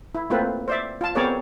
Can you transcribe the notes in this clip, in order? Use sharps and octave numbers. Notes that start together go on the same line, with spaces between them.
E4
A3 A#3 C4 F4 B4
C5 D5 E5
F4 A5
B3 C4 G#4 A#4 C#5 D5